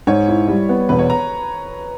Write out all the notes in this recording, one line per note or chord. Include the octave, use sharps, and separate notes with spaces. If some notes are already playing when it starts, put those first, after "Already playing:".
G#2 C#5
E4
G3
B3
E1 B4
C#5
A#5